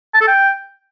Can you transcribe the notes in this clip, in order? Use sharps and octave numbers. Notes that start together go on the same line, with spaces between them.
A5
A4
G5